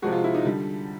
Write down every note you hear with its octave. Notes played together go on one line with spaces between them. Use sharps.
C3 F3 G#3 F#4
F4
E4
D#4
D3 G3